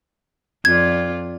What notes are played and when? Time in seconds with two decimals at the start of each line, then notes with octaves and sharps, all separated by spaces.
0.65 F2 F4 D5 G#6